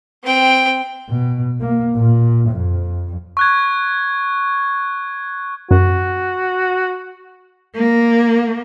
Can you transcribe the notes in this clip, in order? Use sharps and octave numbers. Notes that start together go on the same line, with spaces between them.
C4 G5
B2
A#3
A#2
F2
C#6 F#6 G#6
F#2 F#4
A#3